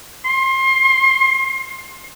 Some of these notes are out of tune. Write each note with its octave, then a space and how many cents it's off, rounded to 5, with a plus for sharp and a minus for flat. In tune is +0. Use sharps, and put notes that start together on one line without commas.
C6 +30